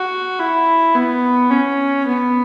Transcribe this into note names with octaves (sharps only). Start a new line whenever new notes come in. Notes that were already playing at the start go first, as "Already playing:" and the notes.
Already playing: F#4
E4
B3
C#4
B3